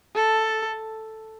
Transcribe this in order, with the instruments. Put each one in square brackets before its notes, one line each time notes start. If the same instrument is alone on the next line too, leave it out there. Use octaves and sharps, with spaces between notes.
[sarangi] A4